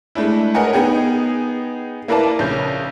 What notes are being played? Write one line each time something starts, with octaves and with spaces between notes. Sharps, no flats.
G#3 A3 D4 E4
A#4 B4 C#5 D#5 F#5 G#5
B3 D#4 G#4 G5
A#3 E4 A#4 B4 D5 A5
A#1 C#3 C#4 G6